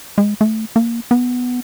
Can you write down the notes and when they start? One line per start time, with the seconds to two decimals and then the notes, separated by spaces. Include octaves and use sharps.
0.18 G#3
0.41 A3
0.76 A#3
1.11 B3